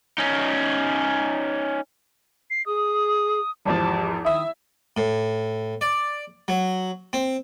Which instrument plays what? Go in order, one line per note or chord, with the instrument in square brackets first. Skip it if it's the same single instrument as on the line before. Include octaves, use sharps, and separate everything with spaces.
[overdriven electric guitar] C#4 D#4
[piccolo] C7
[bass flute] G#4 [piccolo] D#6
[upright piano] G#1 E2 F3 [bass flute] G4 [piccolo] A5
[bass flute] D#3 [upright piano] E4 E5 [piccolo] D#6
[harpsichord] A2
D5
F#3
C4